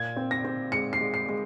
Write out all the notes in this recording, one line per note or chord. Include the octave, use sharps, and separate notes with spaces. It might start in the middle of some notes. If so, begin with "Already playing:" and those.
Already playing: A#2 G#6
C4
A#6
C4
G#3 C#7
C7
G#3
C7
G#3